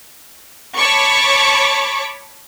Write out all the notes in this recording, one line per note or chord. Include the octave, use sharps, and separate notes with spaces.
C#5 A5 B5 C#6 D6